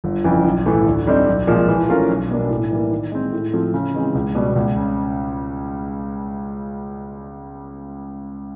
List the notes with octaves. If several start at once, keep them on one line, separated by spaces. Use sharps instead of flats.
G1
F2 C#3 E3
B1
A2 E3 A3
D2
D3 G3 C4 D#4
B1
A#2 F3 G#3
E3
A3 C#4 F4 A#4
B1
B2 G3 A#3 D4
A2
E3 G3 A#3
D#3
G#3 C4
A2
F3 A3 C4 F4
C#3
E3 G#3 C4
C#2
B2 G3
C#2
C#3